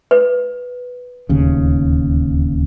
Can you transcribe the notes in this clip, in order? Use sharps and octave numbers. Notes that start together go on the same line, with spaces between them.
B4
D1 D#2 C#3